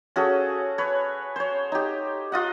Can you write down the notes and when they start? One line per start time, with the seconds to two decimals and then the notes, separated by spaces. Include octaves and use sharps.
0.16 C#4 F#4 G#4 A4
0.78 B4 C#5
1.36 C5 C#5
1.72 D#4 G4
2.32 F4 D#5 F#5